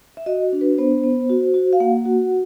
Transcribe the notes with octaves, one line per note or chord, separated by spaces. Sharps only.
E5
F#4 D#5
D4
B4
B3 C5
B3
F#4
F#4
F5
A#3 F#5
F#4